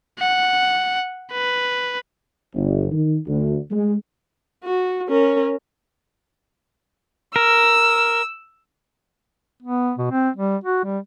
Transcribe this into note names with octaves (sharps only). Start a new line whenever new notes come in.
F#5
B4
G1
D#3
D2
G#3
F#4
C#4 A#4
A#4 E6
B3
B2
C4
G3
F#4
G3